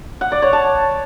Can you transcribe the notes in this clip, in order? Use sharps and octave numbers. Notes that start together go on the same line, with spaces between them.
F#5
D5
C#5
A5